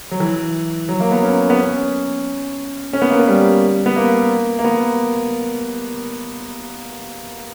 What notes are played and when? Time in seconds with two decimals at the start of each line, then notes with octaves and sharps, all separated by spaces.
0.11 F#3
0.20 E3
0.89 F#3
1.00 A#3
1.12 B3
1.23 C#4
1.50 B3
1.57 C#4
2.93 C#4
3.02 B3
3.11 A#3
3.20 B3
3.28 G3
3.86 B3
3.96 A#3
4.59 A#3
4.64 B3